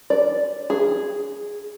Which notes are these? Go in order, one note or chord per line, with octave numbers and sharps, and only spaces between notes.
D5
G#4